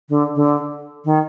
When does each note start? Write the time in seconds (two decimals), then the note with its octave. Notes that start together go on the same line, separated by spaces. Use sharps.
0.09 D3
0.35 D3
1.05 D#3